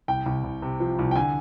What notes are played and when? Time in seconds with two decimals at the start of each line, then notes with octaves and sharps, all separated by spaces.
0.08 C2 G5
0.26 C2
0.44 C2
0.62 C3
0.80 F3
0.99 C2
1.11 G5
1.16 D3 G#5